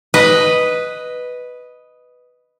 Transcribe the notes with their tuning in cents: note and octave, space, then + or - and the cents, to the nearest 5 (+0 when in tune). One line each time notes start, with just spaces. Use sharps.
B4 +0 D#5 +0